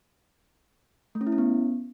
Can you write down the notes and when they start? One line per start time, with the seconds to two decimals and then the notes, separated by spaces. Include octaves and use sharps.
1.15 A3
1.21 C#4
1.27 E4
1.32 C#4
1.38 B3